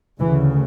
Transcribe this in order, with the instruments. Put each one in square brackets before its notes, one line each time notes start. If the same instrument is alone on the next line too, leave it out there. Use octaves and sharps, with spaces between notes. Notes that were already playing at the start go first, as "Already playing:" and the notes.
[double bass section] D2 C#3 E3